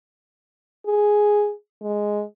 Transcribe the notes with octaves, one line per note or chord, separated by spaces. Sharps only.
G#4
G#3